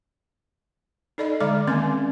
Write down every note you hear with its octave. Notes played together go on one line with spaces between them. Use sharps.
D#4 A4 D5 D#5 B5
D3 G#3 D5 D6
D#3 A#3 C4 C#4 D6